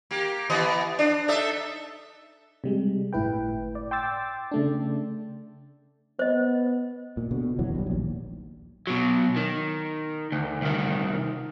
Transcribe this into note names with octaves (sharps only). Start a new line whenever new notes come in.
A#3 G4
E3 B3 D#5
D4
D#4 A4 E5
C3 G3 G#3
G1 A2 E4 B4 G5
D5
G5 C6 D6 E6 A6
C#3 A3 D4
B3 C5 D#5
A#2
B2 D3
F#1 E2 E3 F#3
B1 G3
A#1 D#2
B2 F#3
D#3
D2
C2 D#3